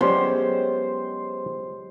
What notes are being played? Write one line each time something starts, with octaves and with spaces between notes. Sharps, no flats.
F#3 G#3 B3 C#4 G4 C5 D5